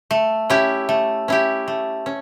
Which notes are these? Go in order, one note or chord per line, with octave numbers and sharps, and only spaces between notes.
A3
C#4 E4 G4
A3
C#4 E4 G4
A3
C#4